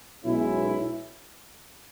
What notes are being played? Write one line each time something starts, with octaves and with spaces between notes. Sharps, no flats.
B1 B2 G#3 C#4 E4